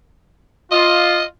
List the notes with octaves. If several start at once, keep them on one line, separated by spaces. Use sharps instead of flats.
F4 D#5